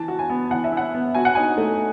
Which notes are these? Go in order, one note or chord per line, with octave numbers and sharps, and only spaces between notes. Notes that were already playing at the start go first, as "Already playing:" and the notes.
Already playing: E3 A5
F#4
G#5
B3
E3 F#5
E5
E4
F#5
B3
F#4 G#5
F#5
D#4 G#5
A3